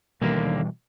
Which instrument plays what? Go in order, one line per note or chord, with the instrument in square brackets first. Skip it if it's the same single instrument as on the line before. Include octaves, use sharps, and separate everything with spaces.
[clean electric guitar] D#2 D3 A#3 [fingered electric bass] B2 E3 G3